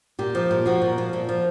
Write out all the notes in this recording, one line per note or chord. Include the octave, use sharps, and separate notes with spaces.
A#2 G4
F3
A#2
F3 F#4
A#2
F3
A#2
F3